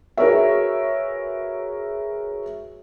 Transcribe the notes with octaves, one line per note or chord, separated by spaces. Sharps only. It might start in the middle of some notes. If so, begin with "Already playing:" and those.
F#4 G#4 A#4 B4 C#5 E5